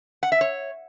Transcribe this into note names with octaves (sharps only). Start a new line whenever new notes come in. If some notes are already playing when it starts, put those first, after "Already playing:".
F#5
E5
C#5